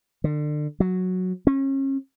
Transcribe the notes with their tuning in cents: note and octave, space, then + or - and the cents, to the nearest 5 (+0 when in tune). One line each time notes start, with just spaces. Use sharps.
D3 +30
F#3 -5
C#4 -35